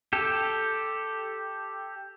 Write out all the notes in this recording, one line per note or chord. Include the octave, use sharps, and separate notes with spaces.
G4 A4